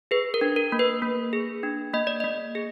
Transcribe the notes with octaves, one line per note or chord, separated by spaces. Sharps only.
G#4 B4
A#4
D4
A#4
A#3
B4
A#3
G#4
D4
A#3 D#5
D5
A#3 D#5
G#4